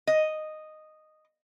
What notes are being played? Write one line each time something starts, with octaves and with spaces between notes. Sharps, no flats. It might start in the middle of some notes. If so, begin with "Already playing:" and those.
D#5